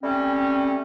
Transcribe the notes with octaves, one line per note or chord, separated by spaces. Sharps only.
G3 A3 C4 C#4